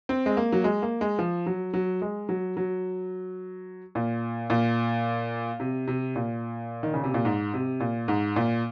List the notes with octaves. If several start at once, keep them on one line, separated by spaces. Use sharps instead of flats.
C4
G#3
A#3
F#3
G#3
A#3
G#3
F3
F#3
F#3
G#3
F#3
F#3
A#2
A#2
C3
C3
A#2
D#3
C#3
C3
A#2
G#2
C3
A#2
G#2
A#2